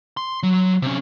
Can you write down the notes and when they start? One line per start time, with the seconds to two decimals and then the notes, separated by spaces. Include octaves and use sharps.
0.17 C6
0.43 F#3
0.82 C3 C#4